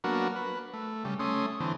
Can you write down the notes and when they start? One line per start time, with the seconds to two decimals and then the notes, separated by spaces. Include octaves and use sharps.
0.04 F#3 A#3 B3 D4 F#4 A#4
0.36 B4
0.74 A3
1.04 C#3 G3
1.19 A3 C#4 C6 D#6
1.60 D3 E3 C4